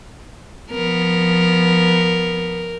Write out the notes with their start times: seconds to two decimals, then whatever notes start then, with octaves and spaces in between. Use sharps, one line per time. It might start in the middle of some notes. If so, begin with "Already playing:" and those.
0.72 F3 B3 A#4